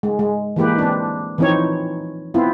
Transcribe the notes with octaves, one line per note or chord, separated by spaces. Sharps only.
G#3
G#3
E3 G#3 A#3 G4 B4
C4 D4
E3 F3 C4 D#4 C#5
B3 C4 E4 F4